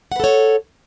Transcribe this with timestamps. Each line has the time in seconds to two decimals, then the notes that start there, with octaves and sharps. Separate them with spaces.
0.12 F#5
0.16 B4
0.20 A4
0.24 C#5